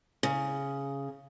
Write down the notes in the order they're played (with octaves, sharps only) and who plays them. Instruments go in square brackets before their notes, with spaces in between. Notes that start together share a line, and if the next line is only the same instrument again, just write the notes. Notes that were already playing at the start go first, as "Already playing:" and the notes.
[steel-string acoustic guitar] C#3